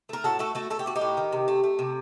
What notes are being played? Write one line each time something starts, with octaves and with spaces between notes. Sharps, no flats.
A3 A#4
A2 F#4 A4
A3 F#4 A4
A3 F#4 A4
A3 A4
G4
A3 F#4
D#4 G4
A2
D#3
C3
A3
A3
C3